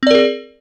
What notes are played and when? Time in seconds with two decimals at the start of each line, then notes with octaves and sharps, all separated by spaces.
0.03 C4
0.07 D5
0.11 A#4
0.15 G#4